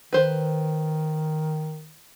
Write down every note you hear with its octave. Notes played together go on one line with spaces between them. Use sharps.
D#3 B4 C5